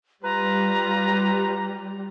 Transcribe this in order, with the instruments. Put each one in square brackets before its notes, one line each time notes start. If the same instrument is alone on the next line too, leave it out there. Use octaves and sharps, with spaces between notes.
[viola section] G3 [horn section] F4 B4 [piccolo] A#5